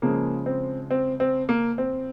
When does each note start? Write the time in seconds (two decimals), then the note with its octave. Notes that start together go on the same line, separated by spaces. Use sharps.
0.02 C#3 F3 G#3 A#3
0.46 C4
0.91 C4
1.20 C4
1.49 A#3
1.78 C4